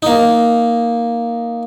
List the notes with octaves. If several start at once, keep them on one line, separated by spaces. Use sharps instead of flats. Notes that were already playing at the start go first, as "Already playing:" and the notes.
A#3 D#4